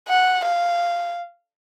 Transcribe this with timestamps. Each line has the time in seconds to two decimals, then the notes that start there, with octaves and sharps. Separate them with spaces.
0.09 F#5
0.45 F5